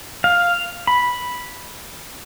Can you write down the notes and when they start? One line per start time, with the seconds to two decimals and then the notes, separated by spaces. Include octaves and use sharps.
0.24 F5
0.87 B5